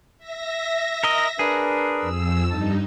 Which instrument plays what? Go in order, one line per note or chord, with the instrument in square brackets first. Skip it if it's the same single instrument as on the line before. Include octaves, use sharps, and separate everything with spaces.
[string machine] E5 A#6
[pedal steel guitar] A#4 D#5
[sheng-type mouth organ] D4 A#4 B4 [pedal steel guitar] G#4
[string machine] F2 E6
[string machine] G2 D#4 [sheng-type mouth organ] A5